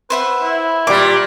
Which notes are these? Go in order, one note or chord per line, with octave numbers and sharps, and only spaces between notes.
B4 C5 E5 F#5
E4
A#2 G3 D6